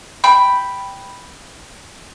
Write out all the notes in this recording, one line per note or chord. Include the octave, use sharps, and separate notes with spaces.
G5 B5